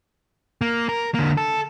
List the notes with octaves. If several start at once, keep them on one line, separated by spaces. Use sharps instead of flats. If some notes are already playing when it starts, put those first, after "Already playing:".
A#3
A#4
D3 A#3
A4